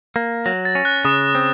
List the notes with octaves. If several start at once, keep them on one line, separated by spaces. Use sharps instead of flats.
A#3
F#3 A#6
A6
C#4
F#6
C#3 D#6
C4